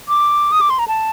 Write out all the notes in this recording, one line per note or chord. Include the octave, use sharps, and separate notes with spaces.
D6
D#6
D6
C6
A#5
A5